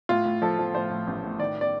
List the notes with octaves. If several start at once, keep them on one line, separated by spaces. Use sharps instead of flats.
A2 F4
A2
F3 A4
F3
A2 C5
A2
A1
A2
D#3 D5
D5